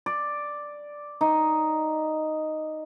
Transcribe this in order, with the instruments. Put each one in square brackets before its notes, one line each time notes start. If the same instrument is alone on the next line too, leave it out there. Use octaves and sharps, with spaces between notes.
[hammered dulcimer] D5
D#4